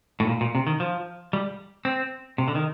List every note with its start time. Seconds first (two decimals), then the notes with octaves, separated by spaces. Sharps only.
0.20 A2
0.27 A#2
0.41 A#2
0.55 C3
0.67 D#3
0.80 F3
1.33 G3
1.85 C4
2.38 C3
2.48 D3
2.55 D#3